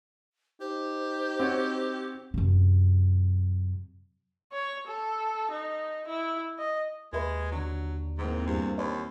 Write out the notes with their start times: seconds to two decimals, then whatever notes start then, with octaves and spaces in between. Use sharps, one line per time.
0.61 D#4 G4 C5
1.40 C4 F#4 C#5
2.34 F#2 C3
4.52 C#5
4.87 A4
5.51 D#4
6.08 E4
6.59 D#5
7.13 D#2 G#3 B4 E5 B5
7.52 D3 F#3 D4
8.18 G#2 E3 A#3 C4
8.47 E2 G2
8.78 D#2 C#5 B5